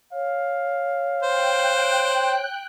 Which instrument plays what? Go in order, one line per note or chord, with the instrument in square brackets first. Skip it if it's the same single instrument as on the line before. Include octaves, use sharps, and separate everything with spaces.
[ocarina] C#5 [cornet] F5
[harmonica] C5 [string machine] G5 F#6